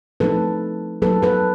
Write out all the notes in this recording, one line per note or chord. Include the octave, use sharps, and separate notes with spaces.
F3 A3 C4 D#4 A4 B4
F#3 A#3 D#4 A4 B4
A4 B4